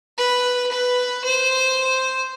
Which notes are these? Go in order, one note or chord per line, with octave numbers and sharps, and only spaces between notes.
B4
B4
C5